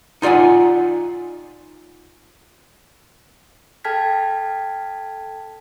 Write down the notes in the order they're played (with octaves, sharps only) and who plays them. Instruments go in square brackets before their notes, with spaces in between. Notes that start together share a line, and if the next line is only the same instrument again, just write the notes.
[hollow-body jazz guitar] D#4 F4 D5 F#5 G#5
[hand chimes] A4 G5 A5 F6 G#6 B6